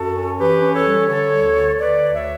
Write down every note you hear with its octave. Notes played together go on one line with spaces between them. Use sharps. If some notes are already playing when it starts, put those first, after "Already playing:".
Already playing: F#2 F#4 A4
C#4
E3 G4 B4
C#4
A4 C#5
G3
D3 A4 C#5
D2
D3
D3 B4 D5
D2
C#5 E5